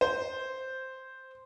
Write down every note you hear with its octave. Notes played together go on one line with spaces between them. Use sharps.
C5